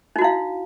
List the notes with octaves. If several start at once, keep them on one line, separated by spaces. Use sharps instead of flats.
D#4 E4 F#4 F5